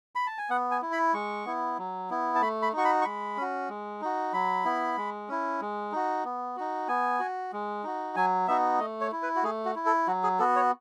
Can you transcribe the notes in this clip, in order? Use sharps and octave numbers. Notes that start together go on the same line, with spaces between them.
B5
A5
G#5
B3 F#5
G#5
E4
B5
G#3 C#6
B3 E4
F#3
B3 E4
A5
A3 B5
B5
D#4 F#4 C#6
B5
C#6
G#3 B5
C#4 F#4
G#3
D#4 F#4
F#3 B5
B3 E4
G#3
C#4 E4
G#3
D#4 F#4
B3
D#4 F#4
B3 G#5
F#4
G#3
D#4 F#4
F#3 G#5
B3 D#4 F#4 E5
A3 D#5
C#5
E4
B4
F#4
A3 G#4
F#4
E4
A4
F#3 F#4
G#4
B3 F#4 A4
C#5